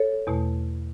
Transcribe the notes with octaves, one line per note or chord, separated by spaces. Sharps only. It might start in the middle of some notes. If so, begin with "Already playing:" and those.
Already playing: A4 C#5
E2 B2 A3